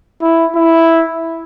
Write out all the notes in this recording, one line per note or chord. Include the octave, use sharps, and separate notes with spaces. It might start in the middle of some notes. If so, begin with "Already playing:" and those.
E4
E4